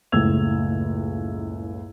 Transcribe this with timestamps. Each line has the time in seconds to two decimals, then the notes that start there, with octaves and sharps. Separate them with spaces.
0.12 F#1 C#2 A2 E6 G#6 F7